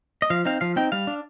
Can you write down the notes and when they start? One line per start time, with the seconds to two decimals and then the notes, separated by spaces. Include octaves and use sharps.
0.22 D#5
0.30 F3 F5
0.45 C4 D#4 F5
0.61 F3 F5
0.76 C4 D#4 G5
0.92 G3 F5
1.07 D4